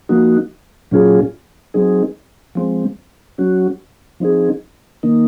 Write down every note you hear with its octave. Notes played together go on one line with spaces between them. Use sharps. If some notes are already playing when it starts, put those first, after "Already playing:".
F3 A#3 D#4 F#4
A#2 F#3 C#4 F4 G#4
F#3 C4 D#4 G#4
F3 G#3 C4
F#3 C#4 F#4
F3 C4 D#4 G#4
D#3 A#3 D#4